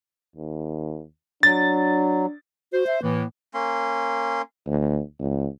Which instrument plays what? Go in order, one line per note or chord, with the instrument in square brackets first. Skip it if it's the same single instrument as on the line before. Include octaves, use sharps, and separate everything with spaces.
[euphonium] D#2
[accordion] F#3 [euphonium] D4 [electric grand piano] A6
[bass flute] F#4 [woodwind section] C5
[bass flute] E5
[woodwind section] A2 E3 [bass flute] A#3
[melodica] A#3 C#4 C6
[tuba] D2
C#2